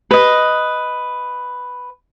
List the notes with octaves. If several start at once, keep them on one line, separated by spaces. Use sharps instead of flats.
B4 D#5